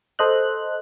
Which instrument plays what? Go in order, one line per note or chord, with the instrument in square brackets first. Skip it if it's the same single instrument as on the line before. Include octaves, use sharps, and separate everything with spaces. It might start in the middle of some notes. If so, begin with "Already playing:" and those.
[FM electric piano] A4 C5 D#5 F#6